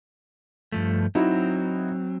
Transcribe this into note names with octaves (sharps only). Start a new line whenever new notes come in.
G2 F3 A3
F#3 C4 D#4 E4 F#4